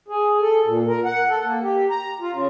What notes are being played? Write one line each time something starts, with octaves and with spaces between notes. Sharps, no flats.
G#4
A4
A#2
A#4
F#5
A4
A#3
G4
A#5
F4
C#3